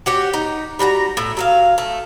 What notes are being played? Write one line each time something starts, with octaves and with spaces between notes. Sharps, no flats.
F#4 G4 C#5
D#4
G3 F#4 G#5 A#5
A2
F#3 E5 F5
A3